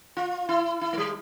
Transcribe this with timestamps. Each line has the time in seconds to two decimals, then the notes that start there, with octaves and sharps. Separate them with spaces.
0.17 F4
0.49 E4
0.81 E4
0.93 A3
0.98 G3